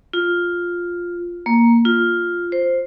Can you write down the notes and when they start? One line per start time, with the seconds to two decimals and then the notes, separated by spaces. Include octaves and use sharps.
0.13 F4
1.46 A#3
1.85 F4
2.52 C5